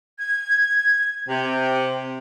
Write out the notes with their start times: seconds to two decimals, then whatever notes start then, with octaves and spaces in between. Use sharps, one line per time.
0.19 G#6
1.28 C3 G5